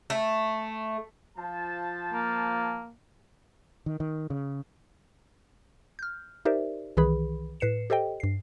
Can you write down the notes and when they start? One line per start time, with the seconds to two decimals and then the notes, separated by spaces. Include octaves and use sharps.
0.10 A3
1.36 F3 A5
2.13 A#3
3.86 D#3
4.00 D#3
4.30 C#3
5.99 F6 G6
6.45 D#4 G4 A#4 C5 D5 E5
6.97 C2 D#3 E3 G#4 B4 B5
7.60 A2 B4 C7 C#7 E7
7.90 G4 A4 C5 D#5 G5
8.20 G2 C7